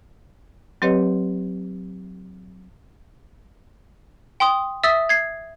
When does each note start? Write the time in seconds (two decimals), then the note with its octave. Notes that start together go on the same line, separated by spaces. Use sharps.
0.82 F#3 C4 G4 B4 C#5 D#5
4.40 G5 C6 D#6
4.83 E5 D#6 E6 A6 B6
5.09 G#6 C7